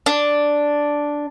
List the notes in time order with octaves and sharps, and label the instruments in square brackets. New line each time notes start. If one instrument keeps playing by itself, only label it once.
[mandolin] D4